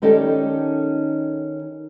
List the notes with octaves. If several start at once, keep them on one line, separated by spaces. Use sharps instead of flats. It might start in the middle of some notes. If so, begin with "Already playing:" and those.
D#3 C#4 D#4 G4 A4 D5